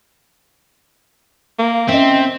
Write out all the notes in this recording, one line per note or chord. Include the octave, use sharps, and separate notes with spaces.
A#3
C4 C#4 D#5 E5